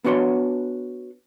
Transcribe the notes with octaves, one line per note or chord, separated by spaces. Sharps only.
B3 D4 F#4 C#5 C6